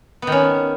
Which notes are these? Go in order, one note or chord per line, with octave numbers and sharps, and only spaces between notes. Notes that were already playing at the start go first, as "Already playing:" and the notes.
D#3 B3 C#4